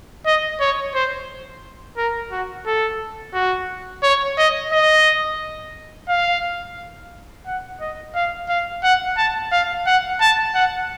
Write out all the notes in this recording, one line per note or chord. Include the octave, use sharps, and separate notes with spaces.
D#5
C#5
C5
A#4
F#4
A4
F#4
C#5
D#5
D#5
F5
F#5
D#5
F5
F5
F#5
A5
F5
F#5
A5
F#5